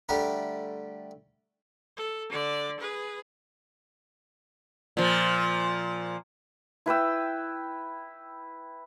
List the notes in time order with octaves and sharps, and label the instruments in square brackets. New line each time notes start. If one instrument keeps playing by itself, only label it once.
[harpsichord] D3 G3 A3 G4 A#4
[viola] A4
D3 D5
G#4 B4
[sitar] A#2 F3
[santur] E4 B4 G5 E6